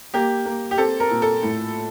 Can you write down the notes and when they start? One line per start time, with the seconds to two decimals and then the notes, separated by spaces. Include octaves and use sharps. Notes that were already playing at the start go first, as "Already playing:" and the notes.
0.14 A#3 G4
0.45 A#3
0.71 G4
0.78 C4 A4
1.00 A#4
1.10 A#2
1.22 A4
1.43 A2